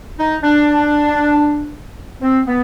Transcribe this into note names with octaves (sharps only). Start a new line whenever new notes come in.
D#4
D4
C4
B3